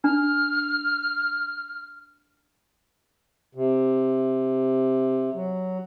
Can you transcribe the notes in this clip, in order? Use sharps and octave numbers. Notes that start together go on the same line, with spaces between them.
D4 F6
C3
F#3